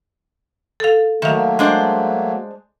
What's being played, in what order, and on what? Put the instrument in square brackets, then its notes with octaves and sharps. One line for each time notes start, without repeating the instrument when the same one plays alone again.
[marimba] A4 F5
[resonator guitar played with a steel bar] D#3 [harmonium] F#3 A3 A#3 [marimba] E5 F5
[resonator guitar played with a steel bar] G#3 D4 C5